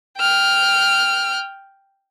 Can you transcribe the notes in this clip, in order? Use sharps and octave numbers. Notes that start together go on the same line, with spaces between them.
G5 F6